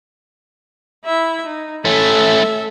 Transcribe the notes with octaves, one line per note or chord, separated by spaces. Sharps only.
E4 E5
D#4
A3 C#4 A4 E5